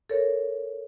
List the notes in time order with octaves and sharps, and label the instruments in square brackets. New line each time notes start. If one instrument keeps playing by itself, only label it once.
[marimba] A4 A#4 C#5